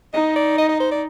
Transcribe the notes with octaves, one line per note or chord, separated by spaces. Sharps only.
D#4 D#5
D5
D#5
D#5
C5
D5